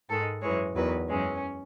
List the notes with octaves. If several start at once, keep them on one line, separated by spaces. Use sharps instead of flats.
G#2 D#3 G#3 A4
F#2 E3 G#3 C#5
E2 D#3 F#3 B4
F#2 E3 G#3 C#4